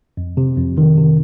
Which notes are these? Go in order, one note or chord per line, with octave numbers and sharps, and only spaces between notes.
F2
C3
F2
D#3
C3